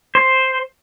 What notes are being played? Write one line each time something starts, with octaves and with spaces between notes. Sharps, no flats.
C5